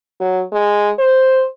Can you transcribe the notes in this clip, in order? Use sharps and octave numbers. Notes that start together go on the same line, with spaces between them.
F#3
G#3
C5